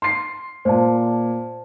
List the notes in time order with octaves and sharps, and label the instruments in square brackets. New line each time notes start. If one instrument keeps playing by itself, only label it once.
[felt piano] C6 C7
[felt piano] A#2 [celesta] C5 A5